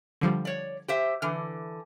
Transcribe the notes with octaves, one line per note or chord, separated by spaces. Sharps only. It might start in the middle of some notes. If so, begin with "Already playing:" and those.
D3 F3 G3
C#5 D5
G4 C5 E5
D3 E3 F6